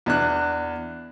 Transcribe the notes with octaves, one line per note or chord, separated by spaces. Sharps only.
E2 D4 F#6